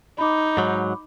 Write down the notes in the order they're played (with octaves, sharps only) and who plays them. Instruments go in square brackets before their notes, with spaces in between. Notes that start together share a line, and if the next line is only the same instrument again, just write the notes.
[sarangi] D#4 [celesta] B5 D6
[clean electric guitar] G#2 F#3